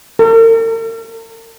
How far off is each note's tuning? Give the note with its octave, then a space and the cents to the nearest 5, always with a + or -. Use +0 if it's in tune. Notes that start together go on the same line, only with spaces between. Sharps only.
A#4 -45